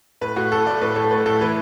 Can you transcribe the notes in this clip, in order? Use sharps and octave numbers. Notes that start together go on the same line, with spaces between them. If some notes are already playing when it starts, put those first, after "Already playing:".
A2 B4
A2 F#4
A3 A4
A3 D5
A2 B4
A2 A4
A3 B4
A2 A4
E3 B4